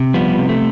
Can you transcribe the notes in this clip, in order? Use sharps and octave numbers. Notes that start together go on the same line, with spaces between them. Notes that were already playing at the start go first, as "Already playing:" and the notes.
Already playing: C3
F3 G3 B3
C3
A3